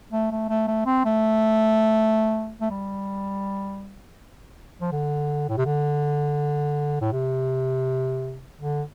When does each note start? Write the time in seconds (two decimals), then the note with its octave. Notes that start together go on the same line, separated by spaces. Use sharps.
0.13 A3
0.31 A3
0.49 A3
0.68 A3
0.86 C4
1.05 A3
2.61 A3
2.70 G3
4.81 F3
4.92 D3
5.49 A2
5.57 C3
5.66 D3
7.01 A2
7.12 C3
8.60 D3